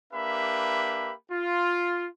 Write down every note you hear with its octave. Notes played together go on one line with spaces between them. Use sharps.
A#3 D4 G4 B4 E5 B5
F4